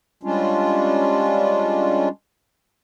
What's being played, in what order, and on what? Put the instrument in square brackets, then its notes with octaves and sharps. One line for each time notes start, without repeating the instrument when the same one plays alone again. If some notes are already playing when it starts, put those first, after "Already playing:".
[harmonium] G3 G#3 C#4 D4 F4